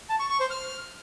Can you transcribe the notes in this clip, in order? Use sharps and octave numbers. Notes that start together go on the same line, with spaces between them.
A5
C#6
C#6
C5
F6